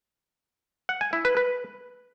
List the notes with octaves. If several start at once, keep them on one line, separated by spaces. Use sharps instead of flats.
F#5
G#5
E4
B4
B4